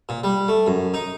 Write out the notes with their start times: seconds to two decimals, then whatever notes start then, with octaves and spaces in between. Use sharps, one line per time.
0.09 A#2
0.24 G3
0.48 A3
0.67 F#2
0.94 D#4